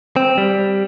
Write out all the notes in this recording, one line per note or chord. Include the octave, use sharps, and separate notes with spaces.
C4
G3